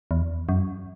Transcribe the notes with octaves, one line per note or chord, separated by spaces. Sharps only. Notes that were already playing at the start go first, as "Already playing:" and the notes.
E2
F#2